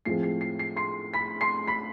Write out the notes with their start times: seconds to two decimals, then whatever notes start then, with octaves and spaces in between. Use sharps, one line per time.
0.05 A2 F3 G#3 C4 C7
0.23 C7
0.41 C7
0.59 C7
0.76 C6 C7
1.14 B5 B6
1.41 C6 C7
1.67 B5 B6